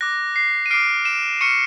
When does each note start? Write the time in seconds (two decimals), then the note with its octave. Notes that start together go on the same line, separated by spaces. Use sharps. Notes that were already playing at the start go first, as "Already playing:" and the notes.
0.01 D6 F#6 A#6
0.36 C7
0.66 D#7
0.71 D6 F6 C7 D7
1.05 D7 E7
1.41 C#6 F6 C#7 D#7